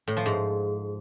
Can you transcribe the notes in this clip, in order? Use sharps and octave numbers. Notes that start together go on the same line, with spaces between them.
A2
F3
G#2